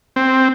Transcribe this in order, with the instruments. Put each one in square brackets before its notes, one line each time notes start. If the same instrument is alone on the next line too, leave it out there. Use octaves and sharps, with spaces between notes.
[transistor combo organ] C4